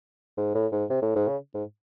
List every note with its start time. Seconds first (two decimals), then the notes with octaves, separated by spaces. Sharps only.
0.38 G#2
0.55 A2
0.72 G#2
0.90 C3
1.02 A2
1.16 G#2
1.28 C#3
1.54 G#2